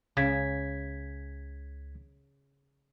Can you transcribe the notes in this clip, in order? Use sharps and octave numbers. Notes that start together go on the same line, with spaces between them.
C#2 C#3 G#6 B6